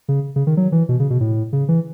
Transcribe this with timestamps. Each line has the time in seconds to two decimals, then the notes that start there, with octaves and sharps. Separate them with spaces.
0.08 C#3
0.36 C#3
0.47 D#3
0.57 F#3
0.72 E3
0.89 B2
1.00 C#3
1.10 B2
1.20 A2
1.53 C#3
1.68 E3